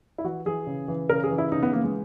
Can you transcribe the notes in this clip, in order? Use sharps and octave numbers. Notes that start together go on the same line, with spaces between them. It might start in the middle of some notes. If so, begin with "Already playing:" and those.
E4
E3 F#4
E3 G#4
C#3
E3
C#3 A#4
G#4
E3
E4
C#3 D#4
B3
E3 A#3
G#3